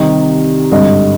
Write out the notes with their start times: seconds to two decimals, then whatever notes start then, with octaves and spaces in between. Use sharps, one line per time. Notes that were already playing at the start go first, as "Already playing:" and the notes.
Already playing: C2 C3 D#3 D#5
0.72 G#1 G2 D3 D#5